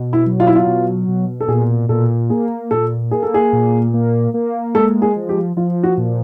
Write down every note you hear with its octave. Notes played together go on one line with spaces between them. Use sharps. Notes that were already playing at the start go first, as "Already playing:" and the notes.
Already playing: B2
E4
F#3
F4
E4
F4
B2
B2
A4
A#2 G#4
A#2 A4
A#3 G#4
A#2 A4
A#3 G#4
A4
G#4
A#2
A#3
A#3
G#3 A4
G#4
F3
G4
F3 F4
F#4
A#2